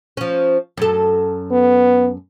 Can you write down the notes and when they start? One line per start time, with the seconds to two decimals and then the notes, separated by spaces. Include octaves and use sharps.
0.17 F3 C#4
0.78 F#2 A4
1.51 B3